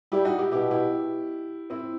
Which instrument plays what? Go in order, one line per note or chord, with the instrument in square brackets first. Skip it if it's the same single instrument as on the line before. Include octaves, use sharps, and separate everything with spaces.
[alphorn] G3 [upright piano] E4 G4
[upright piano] D#4 F#4
E4 G4
[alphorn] B2 [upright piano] E4 G4
[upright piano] E4 G4
C4 E4